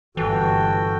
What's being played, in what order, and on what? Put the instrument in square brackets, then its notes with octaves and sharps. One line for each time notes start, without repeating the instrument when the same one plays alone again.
[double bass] G1 A#2 [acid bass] E3 [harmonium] F#4 A4 G5